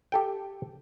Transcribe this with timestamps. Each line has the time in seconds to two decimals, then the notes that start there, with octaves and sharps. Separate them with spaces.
0.12 G4 A4 G5